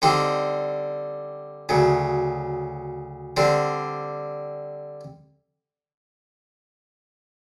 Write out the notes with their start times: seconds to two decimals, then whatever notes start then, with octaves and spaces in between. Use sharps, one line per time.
0.02 D3 G3 C4 D#4
1.69 D2 C#3 F#3
3.37 D3 G3 C4